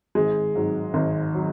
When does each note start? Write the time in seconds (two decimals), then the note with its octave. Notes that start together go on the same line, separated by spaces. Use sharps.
0.15 G#1 G#3
0.55 G#2 F#3
0.94 G#1
1.34 F#3